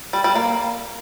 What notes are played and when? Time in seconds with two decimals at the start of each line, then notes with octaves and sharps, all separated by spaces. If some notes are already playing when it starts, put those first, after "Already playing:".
0.13 G3
0.24 G3
0.35 A#3